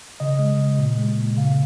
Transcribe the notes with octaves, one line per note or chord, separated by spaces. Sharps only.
C#3 D#5
G#3
C#3
A#2
G#3
A#2
C#3 F5